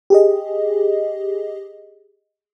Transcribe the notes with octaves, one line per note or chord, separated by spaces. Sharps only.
G4 G#4 D#5